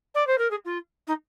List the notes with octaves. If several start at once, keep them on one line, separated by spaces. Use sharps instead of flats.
D5
C5
A#4
G#4
F4
D#4